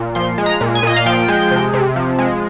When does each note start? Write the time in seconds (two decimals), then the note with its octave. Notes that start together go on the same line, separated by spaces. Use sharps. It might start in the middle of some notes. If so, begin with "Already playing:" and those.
Already playing: A#2
0.15 F3 C6
0.38 G#3
0.46 A#5
0.61 A#2
0.75 G#5
0.83 A#2 D#5
0.96 F5
1.06 F3 G5
1.28 G#3
1.51 C3
1.74 C3
1.96 F3
2.18 G#3